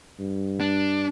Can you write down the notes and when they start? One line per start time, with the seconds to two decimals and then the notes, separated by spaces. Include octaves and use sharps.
0.20 G2
0.60 D4